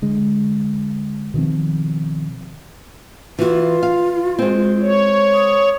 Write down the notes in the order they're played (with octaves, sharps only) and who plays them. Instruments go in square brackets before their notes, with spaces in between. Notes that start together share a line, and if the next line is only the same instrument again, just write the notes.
[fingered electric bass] D3 G#3
B2 D#3 F3 C4
[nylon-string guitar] E3 F#4 [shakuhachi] F4
[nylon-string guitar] F5
G#3 C4
[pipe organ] C#5
[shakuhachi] D#6